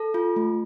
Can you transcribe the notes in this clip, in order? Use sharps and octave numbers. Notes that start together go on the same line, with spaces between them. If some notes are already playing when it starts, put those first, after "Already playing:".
Already playing: A4
F4
A3